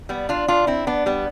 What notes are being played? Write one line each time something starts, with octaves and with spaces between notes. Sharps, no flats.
G3 B3
D4 F4
D4 F4
C4 E4
B3 D4
G3 B3